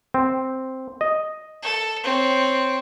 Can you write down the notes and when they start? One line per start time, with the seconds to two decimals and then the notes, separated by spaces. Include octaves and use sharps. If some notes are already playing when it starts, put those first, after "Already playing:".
0.14 C4
1.01 D#5
1.63 A4
2.04 C4 C#5